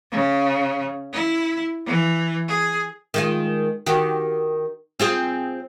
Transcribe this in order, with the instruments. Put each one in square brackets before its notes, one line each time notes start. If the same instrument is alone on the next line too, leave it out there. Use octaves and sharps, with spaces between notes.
[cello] C#3
E4
E3
G#4
[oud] D#3 G#3 F4
D#3 F#4 G4
C4 F4 G#4